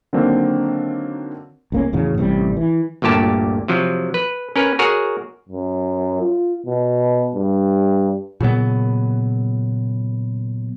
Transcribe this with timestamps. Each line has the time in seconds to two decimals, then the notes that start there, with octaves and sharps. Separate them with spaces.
0.13 D3 D#3 F#3 A#3 C4 D4
1.72 C#2 A#3 C#4
1.93 E2 A2 C#3 F#3
2.18 A1 C3 E3 G3
2.57 E3
3.02 G1 D2 A#2 G4 A5
3.68 C3 F3 F#3
4.14 B4
4.56 C#4 A#4 B4
4.79 F#4 G#4 A#4 C#5 F#5
5.49 F#2
6.21 F4
6.66 B2
7.35 G2
8.40 A#2 C#3 F#3 B3